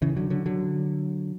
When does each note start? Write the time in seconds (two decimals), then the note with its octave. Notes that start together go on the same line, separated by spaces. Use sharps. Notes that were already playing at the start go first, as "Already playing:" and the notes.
0.02 C#3 E3
0.16 D3 F#3
0.30 D3 F#3
0.46 D3 F#3